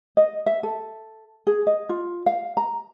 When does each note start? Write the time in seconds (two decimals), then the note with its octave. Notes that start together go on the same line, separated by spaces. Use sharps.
0.17 D#5
0.46 E5
0.63 A4
1.47 G#4
1.67 D#5
1.89 F4
2.26 F5
2.57 A#5